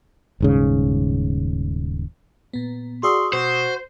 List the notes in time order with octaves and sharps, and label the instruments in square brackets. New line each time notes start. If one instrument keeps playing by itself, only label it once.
[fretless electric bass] D#1 G#2 C#3
[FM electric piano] A#2 B3
[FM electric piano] F#4 G#4 D5 [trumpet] C6 [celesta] C#6 D#6 E6
[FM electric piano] B2 [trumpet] F#4 [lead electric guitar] C5